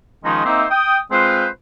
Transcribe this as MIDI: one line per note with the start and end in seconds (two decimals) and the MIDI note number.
0.25 0.44 51
0.25 0.44 53
0.25 0.44 56
0.25 0.44 61
0.25 0.44 63
0.45 0.65 58
0.45 0.65 60
0.45 0.65 63
0.45 0.65 72
0.45 0.65 76
0.71 0.98 79
0.71 0.98 87
1.11 1.47 56
1.11 1.47 60
1.11 1.47 65
1.11 1.47 71
1.11 1.47 72